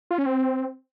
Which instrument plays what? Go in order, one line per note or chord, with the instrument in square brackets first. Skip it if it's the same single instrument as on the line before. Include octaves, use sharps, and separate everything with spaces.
[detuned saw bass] F4
C#4
C4